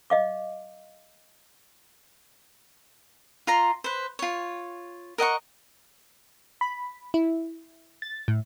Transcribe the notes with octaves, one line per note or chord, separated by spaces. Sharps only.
D#5 F5 D6
F4 A#5 C6
B4 C5
F4 C#5
A#4 D#5 F#5 C#6
B5
E4
A6
A2